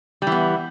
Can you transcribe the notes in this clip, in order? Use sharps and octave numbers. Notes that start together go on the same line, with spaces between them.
E3 G3 B3